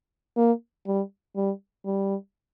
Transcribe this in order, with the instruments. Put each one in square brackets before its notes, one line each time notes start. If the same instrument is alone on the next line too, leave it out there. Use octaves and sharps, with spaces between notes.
[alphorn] A#3
G3
G3
G3